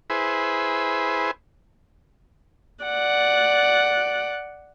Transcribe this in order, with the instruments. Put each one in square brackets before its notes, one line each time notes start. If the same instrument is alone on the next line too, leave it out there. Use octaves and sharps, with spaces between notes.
[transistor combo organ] E4 G#4 B4 C5
[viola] D5 F#5